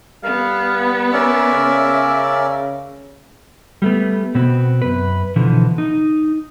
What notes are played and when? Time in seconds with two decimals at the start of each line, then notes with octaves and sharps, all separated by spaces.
0.24 G3 B3 F5
1.13 C#4 A#4 D5 E5
1.53 C#3
3.82 G3 A3 B3
4.35 B2 B3 C4 F#4
4.82 F#2 B4
5.36 B2 D3 E3 F3
5.78 D#4